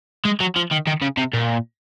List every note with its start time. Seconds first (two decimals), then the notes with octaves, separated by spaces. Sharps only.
0.25 G#3
0.40 F#3
0.56 F3
0.71 D#3
0.87 D#3
1.01 C#3
1.17 C3
1.33 A#2